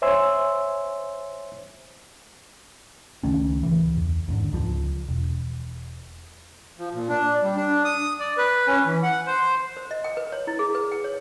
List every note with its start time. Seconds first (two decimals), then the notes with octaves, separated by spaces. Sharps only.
0.02 C5 C#5 E5 G#5 C6 E6
3.23 C#2 D#3 A3 C#4
3.63 D1 C#2 E3
3.97 E2
4.28 D#2 G#2 D3
4.53 C#2 F3
5.09 E1
6.79 F3
6.94 A#2
7.09 D4
7.43 G3
7.56 D4
7.84 D#6
8.20 D5
8.38 B4
8.67 C#4
8.86 E3
9.03 F#5
9.27 C5
9.77 C5
9.91 D#5
10.04 G5
10.17 B4
10.32 C#5
10.47 E4
10.59 G#4
10.75 B4
10.92 G5
11.04 C#5